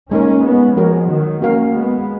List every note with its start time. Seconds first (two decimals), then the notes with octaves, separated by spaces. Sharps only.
0.11 G#3 A#3 C#4 D#4 A#4
0.44 G#3 B3
0.76 F3 G#3 F#4 A#4 C#5
1.10 D#3 F#3
1.42 A#3 C#4 F#4 A#4 F5
1.76 G#3 B3